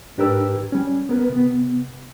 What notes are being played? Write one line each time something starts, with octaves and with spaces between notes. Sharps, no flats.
G#2 D4 G4 A#4 B4 E6
G3 C#4
B3 A#4 B4
C3 B3